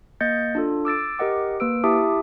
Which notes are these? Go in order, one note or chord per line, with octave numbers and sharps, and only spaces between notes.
A#3 D#5 G6 A6 C#7
D4 F4 A4
D6 E6 A6 D7
G4 A#4 D#5 F#5 D6
A#3 B4 E6 D7
E4 G4 E5 A5 D6 D#6